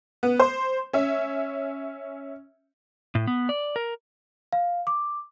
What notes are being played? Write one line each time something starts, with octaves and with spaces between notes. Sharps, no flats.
B3
C5
C#4 E5
A2
B3
D5
A#4
F5
D6